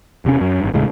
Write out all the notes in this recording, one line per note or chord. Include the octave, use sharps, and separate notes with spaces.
E1 C3 C4 C#4
F#2
G#1 G2
E1 A2 C#3 G#3